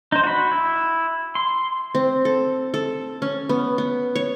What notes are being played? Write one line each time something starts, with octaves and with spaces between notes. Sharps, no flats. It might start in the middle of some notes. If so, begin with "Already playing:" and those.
D#4 C5
F#4 B5
E4
C6
C4
A4
A4
C#4
B3
B3
C#5